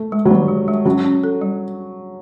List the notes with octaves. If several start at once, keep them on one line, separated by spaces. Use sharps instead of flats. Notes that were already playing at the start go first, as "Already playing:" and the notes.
Already playing: A3
G#3
F#3
D#3 G3
G#3
G#3
F#3 C#4
C#4
A4
G3